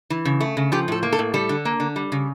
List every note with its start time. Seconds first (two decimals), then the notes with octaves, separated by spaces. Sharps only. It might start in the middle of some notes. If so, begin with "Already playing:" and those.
0.10 E3
0.25 C#3
0.41 A3
0.57 C#3
0.72 F3 G4
0.88 A2 A4
1.03 A#3
1.12 A4
1.19 A2
1.34 G3 A4
1.49 D3
1.65 A#3
1.80 D3
1.96 G3
2.12 C#3